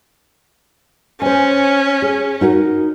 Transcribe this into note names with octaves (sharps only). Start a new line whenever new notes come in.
C#4 C5 G#5
G#4
D#4 F#4 A#4